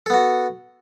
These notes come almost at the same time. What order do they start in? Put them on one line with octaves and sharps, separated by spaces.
A4 B3 F#4